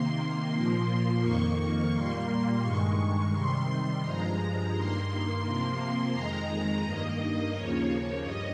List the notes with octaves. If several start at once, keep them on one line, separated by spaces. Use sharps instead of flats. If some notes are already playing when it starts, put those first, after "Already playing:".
Already playing: C3 D#3 A#3 C6
A#2 F3 A#3 C6
F2 D#3 A#3 C#6
A#2 G3 A#3 C6
G2 D#3 G#3 C#6
C3 D#3 G3 C6
G2 F3 G#3 A#5
G2 D#3 A#3 C6
C3 F3 A#3
F2 D#3 G#3 A#5
G2 D#3 A#3 D#5
D#2 C#3 F3 A#3 C#5
G2 G3 D#5